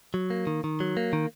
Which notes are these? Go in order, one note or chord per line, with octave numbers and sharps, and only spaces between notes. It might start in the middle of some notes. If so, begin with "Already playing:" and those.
F#3
A#3
D#3
D#3
F#3
A#3
D#3